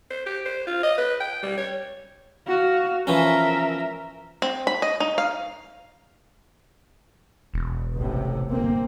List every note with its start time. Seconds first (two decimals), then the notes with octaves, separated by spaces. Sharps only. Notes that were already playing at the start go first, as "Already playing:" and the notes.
0.10 C5
0.26 G4
0.46 C5
0.67 F4
0.83 D#5
0.98 B4
1.20 G5
1.42 G3
1.58 C#5
2.47 F#4 F5
3.07 E3 F3 C#4 A#4 E5
4.42 C4
4.67 B5
4.82 D#5
5.00 D#4
5.18 F5
7.54 E1
7.97 A1 A2 C3
8.49 G1 A#3 C4